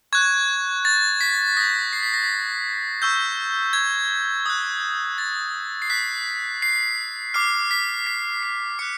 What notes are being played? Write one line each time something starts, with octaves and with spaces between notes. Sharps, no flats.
C#6 F#6 G#6
A6
B6
D#6 G6 A#6
C7
B6
A#6
B6
C#6 E6 G6
G#6
D#6 F#6
A6
C7
D#6 F#6 B6
C7
D6 F6 C7
B6
B6
C7
D6 F#6 C#7